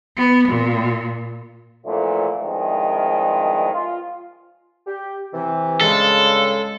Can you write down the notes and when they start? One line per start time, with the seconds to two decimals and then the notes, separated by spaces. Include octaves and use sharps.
0.17 B3
0.48 A#2
1.86 A#2 D3 E3 F3 A3
2.40 C2 G2 D#3 F3 G#3
3.73 F4
4.87 G4
5.34 C3 E3
5.81 G2 C#3 G#3 A4